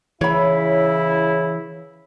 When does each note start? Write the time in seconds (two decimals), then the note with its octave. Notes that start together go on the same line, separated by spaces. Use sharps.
0.21 C#3 E3 E4 C#5 B5